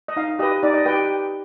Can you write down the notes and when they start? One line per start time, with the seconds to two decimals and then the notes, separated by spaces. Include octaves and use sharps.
0.08 D#5
0.16 D#4 F5
0.39 G4 D#5
0.43 B4
0.63 D#4 D5
0.74 D#5
0.86 G4 B4 G5